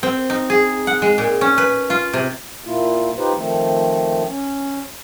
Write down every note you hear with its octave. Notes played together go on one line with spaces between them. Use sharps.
C4
D#4
G#4
F#5
G#3
A#2
C#4
B4
F4
C3
A#2 A#3 E4 F4
D#4 F4 G4 B4 C5
D#3 F3 A3 C4
C#4